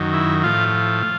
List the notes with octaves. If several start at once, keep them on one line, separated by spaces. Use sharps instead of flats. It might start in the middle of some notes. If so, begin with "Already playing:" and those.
Already playing: F#2 D#3
E4
A2 F3 F4
F4